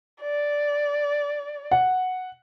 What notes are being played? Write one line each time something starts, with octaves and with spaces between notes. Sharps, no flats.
D5
F#5